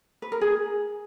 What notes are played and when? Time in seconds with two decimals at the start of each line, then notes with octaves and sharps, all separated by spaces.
0.22 B4
0.32 A#4
0.41 G#4